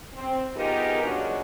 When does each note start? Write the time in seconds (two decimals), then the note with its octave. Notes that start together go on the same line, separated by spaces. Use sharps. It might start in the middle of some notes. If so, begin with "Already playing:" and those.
0.14 C4
0.55 B3 D#4 F4 G4 G#4 A#4
1.03 A#2 C#3 F#3 G#3 D4 F#4